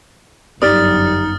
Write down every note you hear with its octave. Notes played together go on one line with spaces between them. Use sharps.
G1 F#2 D#4 G4 D5 D#6 F6 A6